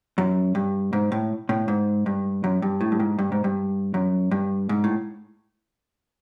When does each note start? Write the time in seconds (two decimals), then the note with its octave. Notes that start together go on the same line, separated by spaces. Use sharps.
0.18 F#2
0.55 G2
0.93 G#2
1.12 A2
1.49 A2
1.68 G#2
2.06 G2
2.44 F#2
2.62 G2
2.81 A2
2.92 G2
3.00 G#2
3.19 G2
3.32 G#2
3.44 G2
3.94 F#2
4.31 G2
4.69 G#2
4.84 A2